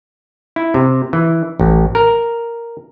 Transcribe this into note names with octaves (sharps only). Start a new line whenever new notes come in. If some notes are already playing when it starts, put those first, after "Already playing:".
E4
C3
E3
A1
A#4